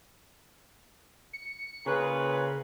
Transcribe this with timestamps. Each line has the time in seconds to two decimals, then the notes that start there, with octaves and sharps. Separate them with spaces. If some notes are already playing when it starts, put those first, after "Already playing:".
1.33 C#7
1.86 A#2 C#3 C#4 B4